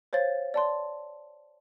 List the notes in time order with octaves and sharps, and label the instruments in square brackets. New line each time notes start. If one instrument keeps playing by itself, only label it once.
[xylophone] C5 C#5 F5 A6
D5 A5 C6